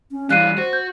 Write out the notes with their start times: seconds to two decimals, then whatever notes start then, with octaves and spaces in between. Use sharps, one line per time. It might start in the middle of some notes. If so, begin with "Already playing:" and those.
0.11 C#4
0.30 E3 G3 F5 F#6 C7 D#7
0.58 F#4 C5
0.73 G6